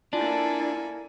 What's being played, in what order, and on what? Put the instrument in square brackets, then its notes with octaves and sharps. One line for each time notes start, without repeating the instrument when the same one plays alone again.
[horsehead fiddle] A#3 E4 [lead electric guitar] D4 [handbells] F4 D5 [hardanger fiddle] A4 G#5